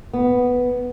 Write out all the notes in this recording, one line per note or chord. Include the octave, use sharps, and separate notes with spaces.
B3